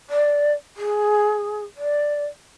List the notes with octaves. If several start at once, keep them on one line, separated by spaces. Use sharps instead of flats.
D5
G#4
D5